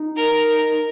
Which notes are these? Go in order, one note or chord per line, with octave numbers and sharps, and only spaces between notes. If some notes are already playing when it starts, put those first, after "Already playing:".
Already playing: D#4
A#4